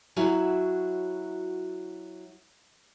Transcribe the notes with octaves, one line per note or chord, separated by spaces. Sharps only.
F#3 E4 F#4 G#5